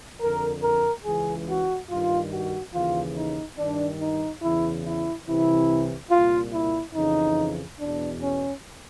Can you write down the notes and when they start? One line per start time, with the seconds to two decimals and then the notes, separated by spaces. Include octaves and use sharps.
0.21 F2 D3 A#4
0.63 A#4
1.05 C#2 C#3 E3 G#4
1.48 F#4
1.90 G2 D#3 F4
2.32 F#4
2.74 D#2 C#3 E3 F4
3.16 D#4
3.58 G2 D#3 D4
4.01 D#4
4.43 E2 C#3 E3 E4
4.85 E4
5.27 C2 C3 E3 E4
6.11 C2 A#2 F4
6.53 E4
6.95 F2 C#3 E3 D#4
7.80 E2 B2 D4
8.21 C#4